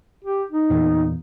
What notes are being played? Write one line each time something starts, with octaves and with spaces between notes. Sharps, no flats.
G4
D#4
E2 A#2